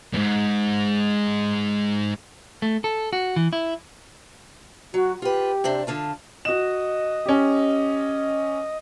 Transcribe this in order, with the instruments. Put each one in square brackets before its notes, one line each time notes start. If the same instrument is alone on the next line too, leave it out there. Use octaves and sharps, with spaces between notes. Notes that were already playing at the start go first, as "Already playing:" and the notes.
[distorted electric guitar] E2 G#2
[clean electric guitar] A3
A4
F#4
E3
E4
[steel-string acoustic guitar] F#3 [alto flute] F#4
[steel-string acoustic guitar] F4 B4 [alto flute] G4
[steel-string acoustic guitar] C3 C4 D4
D3 F4 A5
[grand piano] F#4 E7 [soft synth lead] D#5
[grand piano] C#4 G4